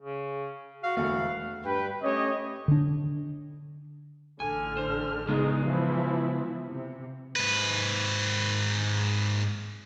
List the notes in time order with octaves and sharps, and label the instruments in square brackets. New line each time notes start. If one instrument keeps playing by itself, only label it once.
[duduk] C#3
[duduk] F#4 [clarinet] F5
[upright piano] E1 D2 A3 [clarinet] F5
[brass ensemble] G2 B4 G5
A3 C#4 G4 C#5 D#5
[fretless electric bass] D3 D4
[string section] A1 D3 F6 [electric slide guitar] G#5
[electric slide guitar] C5
[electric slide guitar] C#3 G#3 B3 [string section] D#4 G#4
[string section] E3 F3 E4
C3
[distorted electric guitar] G#2 B4